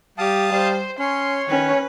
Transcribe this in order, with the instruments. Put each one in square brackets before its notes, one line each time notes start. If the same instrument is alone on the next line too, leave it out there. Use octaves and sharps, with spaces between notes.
[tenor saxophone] G3 [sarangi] G4 [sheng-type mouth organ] F5 A5 D#6
[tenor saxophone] G3 [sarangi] C5
[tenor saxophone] C#4 [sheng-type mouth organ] C#5 [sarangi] C6
[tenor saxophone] D#3 [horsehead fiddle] C#4 [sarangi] B4